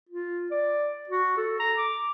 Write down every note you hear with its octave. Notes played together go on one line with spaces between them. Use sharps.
F4
D5
F#4
A4
A#5
D6